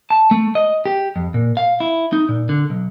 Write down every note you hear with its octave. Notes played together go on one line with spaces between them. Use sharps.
A5
A3
D#5
G4
F2
A#2
F5
E4
D#4
A#2
D3
B1